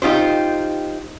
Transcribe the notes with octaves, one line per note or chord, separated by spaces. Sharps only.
D#4 F4 G4 C5